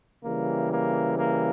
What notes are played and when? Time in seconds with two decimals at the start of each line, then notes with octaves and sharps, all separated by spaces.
0.24 C#3 E3 G3 A#3
0.71 A#3
1.19 A#3